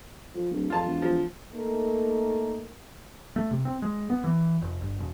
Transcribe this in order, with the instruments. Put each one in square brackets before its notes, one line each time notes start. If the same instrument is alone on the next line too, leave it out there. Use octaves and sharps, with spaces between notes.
[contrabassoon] F3
D1
[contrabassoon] F2 [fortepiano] F4 A5
[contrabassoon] E1
[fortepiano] F3
[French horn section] A3 A#3 D#4 A#4
[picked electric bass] A3
C3
C4
G#3
B3
E3
F1
G1
E1